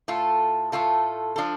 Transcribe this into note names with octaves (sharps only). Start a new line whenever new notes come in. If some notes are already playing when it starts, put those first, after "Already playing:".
A2 A3 F4 A4
A2 A3 F4 A4
F3 D4 F4 A4